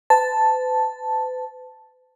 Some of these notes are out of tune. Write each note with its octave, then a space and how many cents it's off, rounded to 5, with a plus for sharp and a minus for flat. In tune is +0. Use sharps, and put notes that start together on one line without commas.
B4 +45 A5 +0